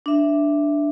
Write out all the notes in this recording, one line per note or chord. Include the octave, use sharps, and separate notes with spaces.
D4 E5